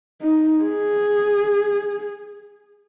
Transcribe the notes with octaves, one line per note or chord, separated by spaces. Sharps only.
D#4
G#4